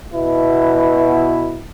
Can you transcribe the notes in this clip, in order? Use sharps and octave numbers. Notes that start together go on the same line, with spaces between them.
B2 E4